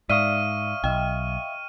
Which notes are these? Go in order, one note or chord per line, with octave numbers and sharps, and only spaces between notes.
G#2 D5 E5 F5 C#6 D#6 F6 D#7
B1 D#5 G5